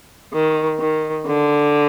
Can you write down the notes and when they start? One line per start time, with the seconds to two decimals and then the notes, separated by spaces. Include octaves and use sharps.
0.33 D#3
0.79 D#3
1.26 D3